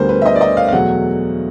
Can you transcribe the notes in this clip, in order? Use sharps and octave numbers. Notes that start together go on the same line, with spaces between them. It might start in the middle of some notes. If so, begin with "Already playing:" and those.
Already playing: D2 D3 G3 B3 A#4 C5
B4
E5
D#5
D5
D#5
F5
F5
E2 B2 F#3 A3 F#5